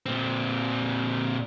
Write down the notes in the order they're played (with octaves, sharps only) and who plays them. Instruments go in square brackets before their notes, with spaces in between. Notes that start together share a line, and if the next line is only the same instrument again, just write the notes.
[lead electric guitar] A#2 C4